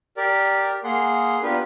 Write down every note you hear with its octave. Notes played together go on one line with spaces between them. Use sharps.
G4 A#4 D5
A#3 G#4 F#5 C6
B3 D4 F4 G4 A#4 B4